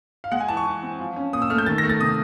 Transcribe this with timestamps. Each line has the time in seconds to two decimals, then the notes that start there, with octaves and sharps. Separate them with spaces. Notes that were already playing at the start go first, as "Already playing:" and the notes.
0.24 F5
0.32 G#3 F#5
0.40 G#5
0.48 E3 A5
0.57 C#6
0.66 E3
0.83 C4
1.00 F3
1.16 C#4
1.33 A#2 D#6
1.42 E6
1.50 A3 F6
1.58 G6
1.66 D#3 A6
1.78 A#6
1.83 A3
1.90 A6
2.00 C3 D#6